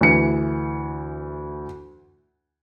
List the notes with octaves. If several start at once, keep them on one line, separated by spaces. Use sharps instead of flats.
D2 E3 C#7